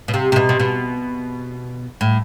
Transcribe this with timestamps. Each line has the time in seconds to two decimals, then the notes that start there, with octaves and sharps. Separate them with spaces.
0.08 B2
0.14 C3
0.32 C3
0.36 B2
0.49 C3
0.60 B2
2.01 A2